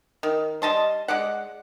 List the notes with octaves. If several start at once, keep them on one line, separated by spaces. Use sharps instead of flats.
D#3
G3 D#5 A5 C6
G#3 D5 F#5